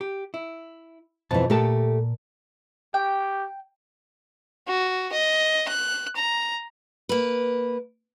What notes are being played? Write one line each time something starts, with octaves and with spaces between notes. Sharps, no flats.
G4
E4
B1 F2 B2 E3 A5
A#2 A3 G4 A#4 A5
G4 G5
F#4
D#5
F#6
A#5
A#3 B4